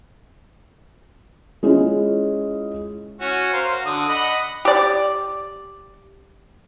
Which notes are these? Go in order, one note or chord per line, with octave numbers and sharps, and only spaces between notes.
G#3 C#4 E4 F4 G#4
C#4 F#4
A#4 C5 F5
F#4
D3 D#6
D#5 F#5 B5
G4 D5